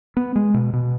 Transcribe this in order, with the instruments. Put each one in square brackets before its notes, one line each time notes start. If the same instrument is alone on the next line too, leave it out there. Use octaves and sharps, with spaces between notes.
[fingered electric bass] B3
G#3
B2
B2